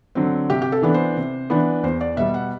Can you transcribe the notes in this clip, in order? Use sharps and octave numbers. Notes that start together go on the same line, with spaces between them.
D3 F#3 C4
C3 G4
G4
A4
E3 B3 D4
C5
C3
E3 B3 D4
E2 C5
D5
B2 G3 E5
F#5